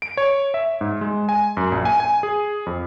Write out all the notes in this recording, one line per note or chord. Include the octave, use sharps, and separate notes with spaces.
D7
C#5
E5
G#2
G#3
G#5
F#2
A#1
G#5
G#5
G#4
F2